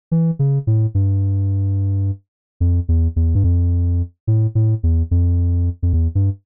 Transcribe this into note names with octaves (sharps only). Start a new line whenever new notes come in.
E3
C#3
A2
G2
F2
E2
E2
G2
F2
A2
A2
E2
F2
F2
E2
G2